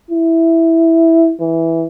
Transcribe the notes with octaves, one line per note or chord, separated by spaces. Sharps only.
E4
E3